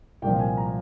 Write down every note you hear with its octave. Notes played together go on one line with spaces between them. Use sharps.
C2 A#2 F3 G5
G#5
A#5